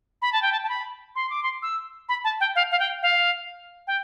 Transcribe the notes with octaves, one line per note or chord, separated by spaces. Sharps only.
B5
A5
G5
A5
A5
B5
C6
D6
C6
E6
B5
A5
G5
F5
F5
G5
F5
G5